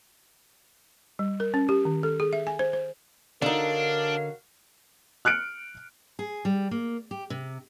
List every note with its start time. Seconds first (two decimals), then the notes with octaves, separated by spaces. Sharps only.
1.19 G3
1.40 A#4
1.54 C#4
1.69 G4
1.85 D#3
2.03 A4
2.20 G#4
2.33 E5
2.47 G#5
2.59 C5
2.73 C5
3.42 D3 D4 D#4 F#4 A#4 C#5 F5
5.25 F6 F#6 C#7 D7
6.19 G#4
6.45 G3
6.71 A#3
7.11 G4
7.30 C3